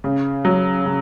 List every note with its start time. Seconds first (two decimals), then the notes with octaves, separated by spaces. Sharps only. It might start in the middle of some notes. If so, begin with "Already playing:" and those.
0.04 C#3
0.45 F#3
0.85 C#3